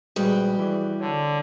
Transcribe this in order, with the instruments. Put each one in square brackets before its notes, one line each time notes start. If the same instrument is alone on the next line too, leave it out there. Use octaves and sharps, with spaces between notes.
[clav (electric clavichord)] A#1 G#3 [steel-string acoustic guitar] G3 [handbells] F#4 G#4 B4
[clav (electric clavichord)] E3 D5
[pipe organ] D3 [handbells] C#5